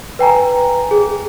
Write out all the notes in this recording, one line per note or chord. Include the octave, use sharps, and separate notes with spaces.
B4 G5 G#5 A#5
G#4